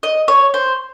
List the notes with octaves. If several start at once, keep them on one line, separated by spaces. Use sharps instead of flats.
D#5
C#5
C5